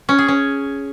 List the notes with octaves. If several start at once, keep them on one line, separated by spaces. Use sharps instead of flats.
C#4
G#4
C#4